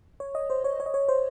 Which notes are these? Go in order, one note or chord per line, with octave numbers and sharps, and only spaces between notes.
C#5
D#5
C5
C#5
C#5
D#5
C#5
C5